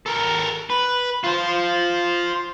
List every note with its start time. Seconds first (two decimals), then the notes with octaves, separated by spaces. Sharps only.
0.06 A4 A#4
0.70 B4
1.24 F4 C5